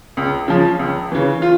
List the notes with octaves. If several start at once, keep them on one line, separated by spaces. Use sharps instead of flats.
C#2
C#3 F3
C#2
C#3 E3
F4